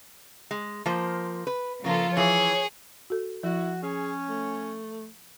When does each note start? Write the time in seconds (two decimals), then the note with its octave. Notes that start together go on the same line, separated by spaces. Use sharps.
0.51 G#3
0.86 F3 A#3 C5
1.47 B4
1.84 C#3 F3 A#3 F4 A4
2.17 E3 G#4 C#5
3.10 F#4 A4
3.43 F3 E4 F#4
3.83 C#4 G#4
4.29 A3